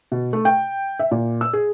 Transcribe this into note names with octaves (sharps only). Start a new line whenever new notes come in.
B2
A3
G5
E5
A#2
E6
G#4